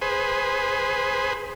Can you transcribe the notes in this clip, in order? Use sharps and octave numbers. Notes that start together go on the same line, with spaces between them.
G#4 B4 C5